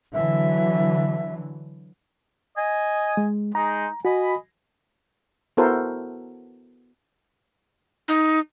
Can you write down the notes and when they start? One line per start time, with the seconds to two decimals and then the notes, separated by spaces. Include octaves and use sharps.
0.14 D3 E3 F#3 E5
2.57 D#5 G#5
3.17 G#3
3.55 G#3 D#4 A#5
4.05 F#4 D#5 G#5 B5
5.57 B3 E4 F#4 A4 A#4 C5
8.08 D#4